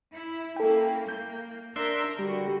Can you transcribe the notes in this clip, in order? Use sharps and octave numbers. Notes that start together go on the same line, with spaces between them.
E4
A#3 C#4 E4 A4 G5
A#3 G6
D4 A#4 E5 C6
D3 G3 F#4